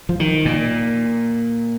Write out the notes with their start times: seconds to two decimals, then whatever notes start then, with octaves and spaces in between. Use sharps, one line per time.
0.09 F3
0.20 D#3
0.45 A#2